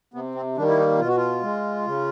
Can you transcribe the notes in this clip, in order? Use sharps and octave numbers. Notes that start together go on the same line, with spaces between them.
C3 B3
C4
D#3 G3 A#3 D4
E4
D#4
B2 F4
F#4
F4
G#3
C#3